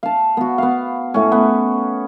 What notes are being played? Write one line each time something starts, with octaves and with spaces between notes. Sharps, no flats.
F5 A5
B3 F#4
B3 F5
A2 C#4
B3